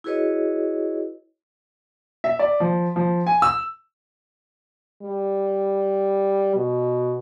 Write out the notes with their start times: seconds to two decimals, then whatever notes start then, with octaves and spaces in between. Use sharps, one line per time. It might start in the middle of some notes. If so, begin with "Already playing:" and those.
0.04 E4 F#4 G#4 B4 C#5 D#5
2.24 E5
2.39 D5
2.60 F3
2.96 F3
3.27 G#5
3.42 E6
5.02 G3
6.56 B2